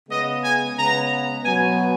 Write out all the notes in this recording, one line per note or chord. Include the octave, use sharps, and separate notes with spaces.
C#3 G#3 B3 D#5
G#5
C#3 G#3 B3 A#5
B2 F#3 B3 G#5